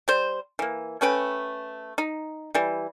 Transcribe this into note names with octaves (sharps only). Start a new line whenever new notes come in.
G3 C5
E3 A#3
A3 C#4 B4 G5
D#4
E3 G3